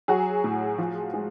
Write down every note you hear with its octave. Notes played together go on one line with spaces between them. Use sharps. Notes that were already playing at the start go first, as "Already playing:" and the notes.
F#3 F#4 G#4
A2
F3
G#3